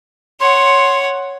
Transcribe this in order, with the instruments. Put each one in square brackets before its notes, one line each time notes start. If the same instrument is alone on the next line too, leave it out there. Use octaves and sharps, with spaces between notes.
[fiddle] C#5 F#5 [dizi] C6